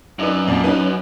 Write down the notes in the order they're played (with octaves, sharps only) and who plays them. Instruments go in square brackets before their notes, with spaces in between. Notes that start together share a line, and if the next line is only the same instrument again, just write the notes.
[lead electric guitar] F#2 [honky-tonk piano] D4 D#4 B4
[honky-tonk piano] F2 A#2 D5
C#4 D#4 B4